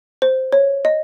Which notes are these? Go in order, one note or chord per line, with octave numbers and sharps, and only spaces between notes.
C5
C#5
D#5